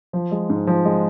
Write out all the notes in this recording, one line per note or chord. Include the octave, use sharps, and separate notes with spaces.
F3
G#3
G#2
F3
G#3